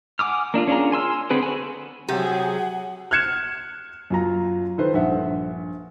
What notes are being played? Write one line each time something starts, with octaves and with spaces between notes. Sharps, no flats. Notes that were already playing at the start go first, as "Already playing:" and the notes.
F#5 G#5 D6 D#6 F6
A#3 D4 E4 F4
C#4 D4 F4 G#4 A#4
G#5 C6 E6 F6
D3 B3 C4 G#4 B4
F#4 A4 B4 G#5
C3 F#3 G4 G#4 F#5
F6 F#6 G#6 C#7 E7
F#2 F4 A#5
D#3 A4 B4 C5
A#1 G2 E5 F#5